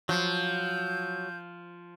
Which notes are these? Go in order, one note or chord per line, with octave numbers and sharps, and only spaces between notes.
F3 F#3 G6